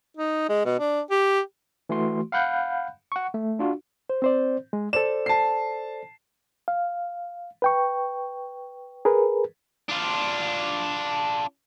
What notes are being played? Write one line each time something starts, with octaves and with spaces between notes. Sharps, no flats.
D#4
G#3
B2
D4
G4
E3 A3 F#4 C6
F5 F#5 B5 F#6 G6
F#5 C#6
A3
D4 F4 F#4
C5
C4 C5 D5
G#3
A4 C5 D5 E7
A5 C7
F5
B4 G5 C#6
G#4 A#4 B4
D4 F4